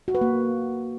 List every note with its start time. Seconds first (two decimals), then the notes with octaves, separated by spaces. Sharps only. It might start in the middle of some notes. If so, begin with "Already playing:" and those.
0.08 F#4
0.15 B4
0.21 A#3